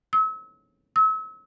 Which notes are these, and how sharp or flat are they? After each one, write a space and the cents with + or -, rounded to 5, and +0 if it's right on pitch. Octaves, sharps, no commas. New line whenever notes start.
E6 -35
E6 -40